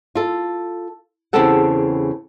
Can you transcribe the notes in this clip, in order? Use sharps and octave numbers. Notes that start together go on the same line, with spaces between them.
F4 A4
E2 C#3 C4 G4 A4 F#5